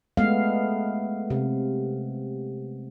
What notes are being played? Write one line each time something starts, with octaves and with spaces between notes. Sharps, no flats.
G#3 A3 B3 F5
C3